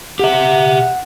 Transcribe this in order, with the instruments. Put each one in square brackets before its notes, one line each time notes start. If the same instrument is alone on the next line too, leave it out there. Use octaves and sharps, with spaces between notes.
[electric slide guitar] G4 E5 [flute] F#5